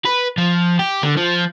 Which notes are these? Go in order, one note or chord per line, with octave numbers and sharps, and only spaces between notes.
B4
F3
G4
D3
F3